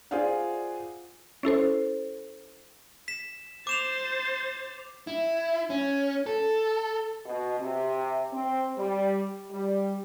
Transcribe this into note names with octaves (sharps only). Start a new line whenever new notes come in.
F4 G#4 C5 D5 F5 F#5
C#4 E4 A4 C5
B6 E7
C5 D6 A6 E7 F7
E4
C#4
A4
B2
C3
C4
G3
G3